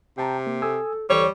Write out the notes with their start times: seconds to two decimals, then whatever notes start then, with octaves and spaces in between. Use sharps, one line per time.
0.18 C3 G5 A5 A#5
0.47 A#3
0.62 A4 G#5 D#6 E6
1.10 D2 E3 G3 A4 C5 C#5